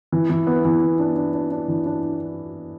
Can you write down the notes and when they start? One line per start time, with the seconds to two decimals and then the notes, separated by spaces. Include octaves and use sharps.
0.12 E3
0.30 E3
0.47 B3
0.65 E3
0.82 B3
0.99 D4
1.16 D4
1.33 D4
1.51 D4
1.68 E3
1.86 D4